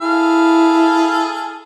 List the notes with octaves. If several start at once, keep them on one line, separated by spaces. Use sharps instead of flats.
E4 G#4 A4 F5